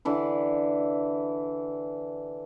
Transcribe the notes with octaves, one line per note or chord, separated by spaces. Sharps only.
D3 E3 E4